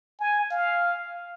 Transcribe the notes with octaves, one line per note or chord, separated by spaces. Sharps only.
G#5
F5